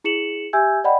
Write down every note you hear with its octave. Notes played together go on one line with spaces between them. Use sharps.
E4 G#4 C#7 E7 F#7
G4 E5 G#5 E6 G6 G#6
D5 D#5 F#5 G5 B5